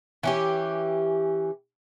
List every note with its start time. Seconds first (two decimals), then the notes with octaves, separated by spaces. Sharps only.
0.23 E3 C#4 G4